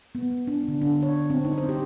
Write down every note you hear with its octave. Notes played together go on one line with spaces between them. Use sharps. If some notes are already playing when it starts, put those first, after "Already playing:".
B3
D4
D3
D4
C#5
C4
D#4
C5
G4